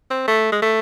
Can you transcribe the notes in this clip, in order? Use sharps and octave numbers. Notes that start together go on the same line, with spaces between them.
C4
A3
G#3
A3